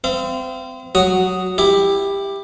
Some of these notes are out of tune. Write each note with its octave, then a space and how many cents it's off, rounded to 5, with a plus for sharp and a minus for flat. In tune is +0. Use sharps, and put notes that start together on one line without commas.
C4 -30 F5 -45
F#3 +0 F#4 +10 D#6 +0
E4 +0 G4 +15